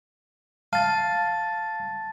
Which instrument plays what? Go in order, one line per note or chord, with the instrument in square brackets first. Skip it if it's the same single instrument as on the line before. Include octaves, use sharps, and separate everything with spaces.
[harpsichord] F5 [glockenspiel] A5 A6